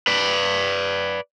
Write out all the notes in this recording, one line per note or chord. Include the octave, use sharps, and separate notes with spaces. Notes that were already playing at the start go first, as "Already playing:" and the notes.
B4 D5